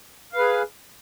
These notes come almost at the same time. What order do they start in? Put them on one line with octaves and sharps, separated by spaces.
F5 B4 G#4